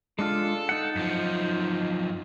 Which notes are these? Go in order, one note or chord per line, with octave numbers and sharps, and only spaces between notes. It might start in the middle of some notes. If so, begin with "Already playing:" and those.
G#3 D4 F4 A4
D#4 F#5
F#2 F3